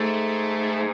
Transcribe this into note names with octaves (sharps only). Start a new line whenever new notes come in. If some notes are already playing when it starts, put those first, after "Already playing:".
Already playing: G#2 A3